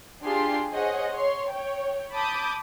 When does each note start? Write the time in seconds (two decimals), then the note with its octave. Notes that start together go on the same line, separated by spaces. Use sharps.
0.25 D4 F4 G4 G#4 C6
0.71 G#4 C5 C#5 D#5 F#5
1.14 C#5 C6
1.52 C#5 G5
2.13 A5 B5 D6 D#6 G6